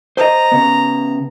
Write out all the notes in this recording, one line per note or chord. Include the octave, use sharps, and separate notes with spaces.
C5 D#5 A#5
C#3 B3